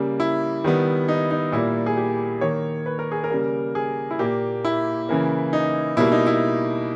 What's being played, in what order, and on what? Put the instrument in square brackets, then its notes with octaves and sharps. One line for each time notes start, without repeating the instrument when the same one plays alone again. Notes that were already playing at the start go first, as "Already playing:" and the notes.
Already playing: [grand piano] C#3 G3 A#3
E4
D#3 G3 B3
D#4
D#4
A#2 G3 A#3 E4
G#4
G4
D#3 A#3 C#5
B4
A#4
G#4
A#4
C#3 G3 A#3
G#4
E4
A#2 A#3 G4
E4
C#3 E3 A#3
D#4
B2 G3 A#3 E4
D#4
E4